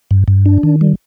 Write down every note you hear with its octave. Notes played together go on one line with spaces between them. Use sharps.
G2
G2
D4
D#3
G3